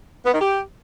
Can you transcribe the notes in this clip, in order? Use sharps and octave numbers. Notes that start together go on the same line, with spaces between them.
B3
D#3
G4